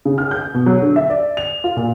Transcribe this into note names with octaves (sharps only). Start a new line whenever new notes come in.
C#3
F6
G6
B2
F#3
D3
E5
D5
F7
F4
A#2